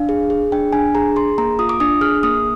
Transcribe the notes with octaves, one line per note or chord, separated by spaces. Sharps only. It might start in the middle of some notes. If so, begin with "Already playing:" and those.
Already playing: D4 F5
G#4
G#4
D4 G5
D4 G#5
G#4 A#5
G#4 C6
A#3 A#5
F4 D#6
D6
D4 D#6
G#4 F6
A#3 D#6